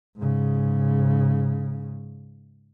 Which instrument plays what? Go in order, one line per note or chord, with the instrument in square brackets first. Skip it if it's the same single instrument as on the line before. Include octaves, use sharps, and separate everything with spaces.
[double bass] G#2 C#3